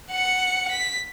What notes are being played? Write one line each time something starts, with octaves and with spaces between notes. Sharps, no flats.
F#5 C#7
B6